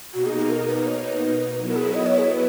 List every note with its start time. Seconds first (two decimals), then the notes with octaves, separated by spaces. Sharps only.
0.14 B2 A#3 D#4 F#4
0.26 G#4
0.38 G#4
0.50 A#4
0.68 B4
0.86 C#5
1.04 B4
1.58 F#3 B3 E4
1.68 A#4
1.76 G#4
1.94 D#5
2.06 C#5
2.18 G#4
2.30 B4